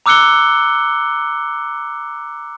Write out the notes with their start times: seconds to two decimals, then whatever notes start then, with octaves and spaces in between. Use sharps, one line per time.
0.06 A#5 D6 E6 F#6 C#7 G7